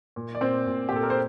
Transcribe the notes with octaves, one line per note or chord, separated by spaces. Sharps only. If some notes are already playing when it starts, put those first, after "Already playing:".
A#2
D5
A#2 C4 C5
A#2
G4
A#2 A4
A#4
C5